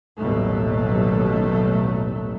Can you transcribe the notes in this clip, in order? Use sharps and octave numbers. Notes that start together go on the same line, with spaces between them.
A1 D#2 B2 F#3 G3 A3